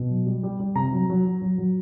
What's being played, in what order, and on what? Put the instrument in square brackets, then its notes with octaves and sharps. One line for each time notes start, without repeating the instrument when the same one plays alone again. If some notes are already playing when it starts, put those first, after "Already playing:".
Already playing: [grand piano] B2
F#3
G3
G3
G3
C3 A#5
F#3
F#3
F#3
F#3
F#3